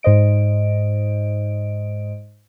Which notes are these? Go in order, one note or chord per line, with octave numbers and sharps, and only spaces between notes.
G#2 C5 D#5 D7